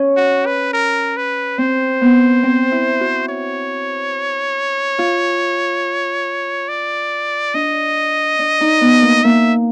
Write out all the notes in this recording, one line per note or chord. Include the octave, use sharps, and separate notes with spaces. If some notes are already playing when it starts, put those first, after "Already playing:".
Already playing: C#4
F#4
B4
A#4
B4
C4 C5
B3
C4
E4
F#4
C#5
F4
D5
D4 D#5
D4
D#4
B3
A#3
A#3 E5